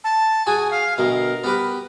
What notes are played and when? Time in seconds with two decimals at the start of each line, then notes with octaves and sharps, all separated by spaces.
0.04 A5
0.47 F#4 G#4 G#5
0.71 F5
0.98 D2 B2 A#4
1.44 B3 G4 B4